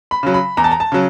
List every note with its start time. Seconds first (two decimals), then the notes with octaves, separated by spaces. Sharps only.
0.11 B5
0.23 C#3 F#3
0.34 B5
0.57 E2 A#5
0.64 A5
0.71 A#5
0.80 A5
0.92 C#3 F#3